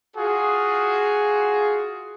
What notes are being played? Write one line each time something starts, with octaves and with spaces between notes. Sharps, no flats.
F4 F#4 G#4